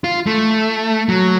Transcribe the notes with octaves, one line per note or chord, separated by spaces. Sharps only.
F4
A3
F#3